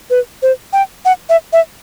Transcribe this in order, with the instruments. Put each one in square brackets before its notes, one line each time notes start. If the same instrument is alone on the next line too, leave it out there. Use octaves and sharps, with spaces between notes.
[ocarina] B4
C5
G5
F#5
E5
E5